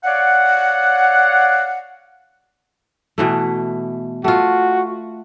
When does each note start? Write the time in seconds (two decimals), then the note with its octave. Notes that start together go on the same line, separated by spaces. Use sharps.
0.04 C#5 D5 F5 F#5
3.18 B2 E3 A3
4.24 A3 F4 F#4